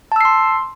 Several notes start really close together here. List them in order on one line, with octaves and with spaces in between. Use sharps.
A5 E6 C7 C6